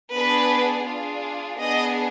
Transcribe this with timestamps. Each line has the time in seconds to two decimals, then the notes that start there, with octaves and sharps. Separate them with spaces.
0.16 B3 D4 G#4 B4
0.87 D4 F4 G#4
1.59 B3 D4 G#4 D#5